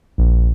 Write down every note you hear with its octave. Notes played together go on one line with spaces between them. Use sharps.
A#1